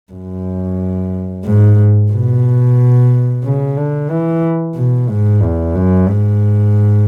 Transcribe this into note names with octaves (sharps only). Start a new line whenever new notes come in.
F#2
G#2
B2
C#3
D3
E3
B2
G#2
E2
F#2
G#2